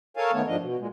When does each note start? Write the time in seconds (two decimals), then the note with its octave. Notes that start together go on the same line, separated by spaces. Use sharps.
0.17 A4 A#4 C#5 F5 G#5 A5
0.33 D#3 A3 B3 C#5
0.47 G#2 F3 D4 D#5
0.61 B2
0.79 A#2 G#3